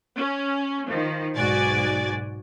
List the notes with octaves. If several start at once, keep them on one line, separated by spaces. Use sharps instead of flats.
C#4
D#3 F3
B1 G#2 F#4 D5 G#5 A6